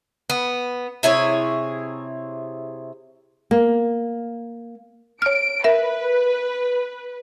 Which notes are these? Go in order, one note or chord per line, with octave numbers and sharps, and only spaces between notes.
B3
C3 E4 G#4 C#5
A#3
C#5 F6 D7
A#4 B4 E5